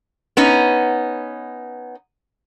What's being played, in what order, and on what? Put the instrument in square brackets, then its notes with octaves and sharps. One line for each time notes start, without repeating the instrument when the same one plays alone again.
[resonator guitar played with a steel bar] B3 C#4 D#4